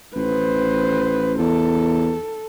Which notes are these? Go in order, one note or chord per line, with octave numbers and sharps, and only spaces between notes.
A1 B4 C5
E2 A4